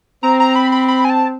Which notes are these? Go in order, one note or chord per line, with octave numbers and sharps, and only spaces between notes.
C4 A#5
A#5
B5
B5
B5
G#5
A5